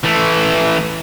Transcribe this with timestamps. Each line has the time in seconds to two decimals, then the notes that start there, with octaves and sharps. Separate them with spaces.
0.04 E3 A3